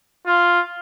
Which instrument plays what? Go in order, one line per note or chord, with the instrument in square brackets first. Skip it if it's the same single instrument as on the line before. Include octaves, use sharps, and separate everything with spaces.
[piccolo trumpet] F4